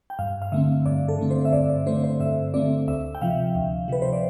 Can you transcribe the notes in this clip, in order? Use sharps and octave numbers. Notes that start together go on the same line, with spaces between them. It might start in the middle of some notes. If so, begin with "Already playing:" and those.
G5
G2 F5
F5
D3 A3 C4 E5
G2 D5
A4
D3 A3 C4
C5
E5
G2 D5
D5
D3 A3 C4 C5
C5
G2 E5
D3 A3 C4 D5
D2 E5
G5
C3 F3 F5
D2
C3 F3 B4
C5
D5